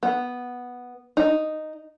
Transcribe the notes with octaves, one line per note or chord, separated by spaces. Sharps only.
B3
D#4